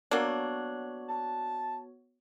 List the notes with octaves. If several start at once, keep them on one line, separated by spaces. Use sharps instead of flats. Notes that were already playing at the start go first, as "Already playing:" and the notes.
F#3 A#3 B3 D4 F#4 C#5
A5